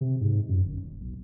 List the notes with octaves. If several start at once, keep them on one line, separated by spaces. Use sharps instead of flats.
C3
G#2
F#2
G1
D#1
B1